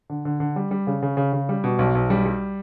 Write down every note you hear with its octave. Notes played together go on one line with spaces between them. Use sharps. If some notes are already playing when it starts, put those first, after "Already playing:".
D3
D3
D3
G3
G3
C#3
C#3
C#3
C#3
G3
B2
B1
B1
G3
G3